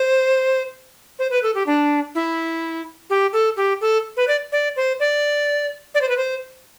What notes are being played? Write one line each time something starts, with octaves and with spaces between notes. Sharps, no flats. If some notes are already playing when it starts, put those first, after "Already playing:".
Already playing: C5
C5
B4
A4
G4
D4
E4
G4
A4
G4
A4
B4
D5
D5
C5
D5
D5
C5
B4
C5